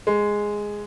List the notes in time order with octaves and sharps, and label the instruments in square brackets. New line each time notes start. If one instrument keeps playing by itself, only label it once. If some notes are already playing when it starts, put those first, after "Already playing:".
[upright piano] G#3